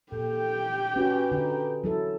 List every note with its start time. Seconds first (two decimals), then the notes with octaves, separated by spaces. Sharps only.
0.12 A#2 G4 A4 G5
0.96 C#4 F#4 B4
1.32 D3 D#4
1.84 F#3 E4 A4